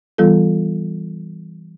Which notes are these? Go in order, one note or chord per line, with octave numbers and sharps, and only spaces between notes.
E3 G3 B3 F4 A4